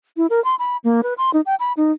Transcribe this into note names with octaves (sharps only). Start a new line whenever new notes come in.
E4
A#4
C6
B5
A#3
B4
C6
D#4
G5
B5
D#4